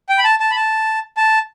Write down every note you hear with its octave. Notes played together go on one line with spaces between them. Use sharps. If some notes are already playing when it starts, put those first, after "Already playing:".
G5
B5
A5
A5
B5
A5
A5